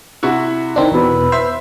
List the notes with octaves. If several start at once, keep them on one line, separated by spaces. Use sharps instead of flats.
C3 E4 F#4
D#3 C4 D4
E2 B2 B4 B5 E6
C5 E5